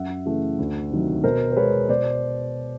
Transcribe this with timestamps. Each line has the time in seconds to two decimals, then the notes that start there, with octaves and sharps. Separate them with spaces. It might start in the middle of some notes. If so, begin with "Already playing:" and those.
Already playing: F#2 E5 F#5
0.26 C#3 E3 A3
0.59 D2
0.91 C3 D#3 F#3
1.24 B2 A#4 C5
1.52 C5
1.57 G#3 B3 B4 C#5
1.89 B2 C5 D5